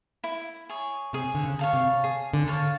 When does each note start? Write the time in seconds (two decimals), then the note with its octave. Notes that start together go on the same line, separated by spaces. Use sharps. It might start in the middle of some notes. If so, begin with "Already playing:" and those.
0.24 E4
0.69 G#4 C#5
1.13 C3 G#4
1.35 D3
1.44 C#3
1.59 C#5 F5 A5
1.73 C3
2.04 G#4
2.34 D3
2.48 C#5 F5 A5